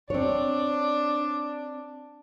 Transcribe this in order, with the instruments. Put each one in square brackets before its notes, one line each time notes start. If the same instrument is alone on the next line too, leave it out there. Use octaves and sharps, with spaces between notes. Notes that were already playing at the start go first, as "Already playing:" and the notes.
[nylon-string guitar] C4 C#5 [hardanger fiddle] D4